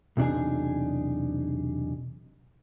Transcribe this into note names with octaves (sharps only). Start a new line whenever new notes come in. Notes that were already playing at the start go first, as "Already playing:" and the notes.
B1 E2 C3 D4 D#4 G#4